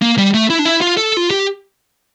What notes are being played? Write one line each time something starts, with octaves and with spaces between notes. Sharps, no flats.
A#3
G3
A3
E4
D4
E4
F4
A4
F4
G4